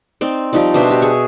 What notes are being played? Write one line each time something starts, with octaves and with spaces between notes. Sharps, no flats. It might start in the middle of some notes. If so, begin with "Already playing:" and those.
C4 D#4 D5
F3 G3 D#4 D5
B2 D4 C5 E5
G4
G#4 C#6